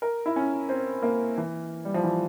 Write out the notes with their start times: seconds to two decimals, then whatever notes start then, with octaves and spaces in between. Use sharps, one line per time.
0.02 A#4
0.26 E4
0.36 C#4
0.69 C4
1.02 A#3
1.37 E3
1.85 G3
1.94 F3
2.04 E3